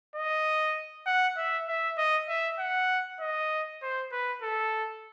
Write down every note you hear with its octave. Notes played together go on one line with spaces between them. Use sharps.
D#5
F#5
E5
E5
D#5
E5
F#5
D#5
C5
B4
A4